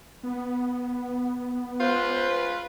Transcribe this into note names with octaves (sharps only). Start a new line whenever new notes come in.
B3
G#3 C#4 F4 B4 C5